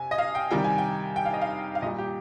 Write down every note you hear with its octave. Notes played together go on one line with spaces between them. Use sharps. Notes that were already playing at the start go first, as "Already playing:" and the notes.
Already playing: C3 G#5
D#5
F5
G5
C3 D#3 G3 G5
G#5
G5
G5
F5
D#5
F5
F5
A#2 G3 D#5
G4